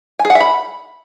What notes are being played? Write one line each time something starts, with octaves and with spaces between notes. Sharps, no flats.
G#5
G#4
F#5
E5
B5